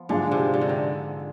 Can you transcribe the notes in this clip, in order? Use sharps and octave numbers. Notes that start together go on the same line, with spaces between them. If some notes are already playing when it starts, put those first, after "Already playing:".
Already playing: F3 B3
G#2 D3 G#3 D4 F4
C3
D3
C3
D3